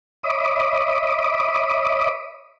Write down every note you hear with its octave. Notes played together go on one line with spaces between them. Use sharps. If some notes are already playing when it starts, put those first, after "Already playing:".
C#5 D#5 E5 B5 D6 D#6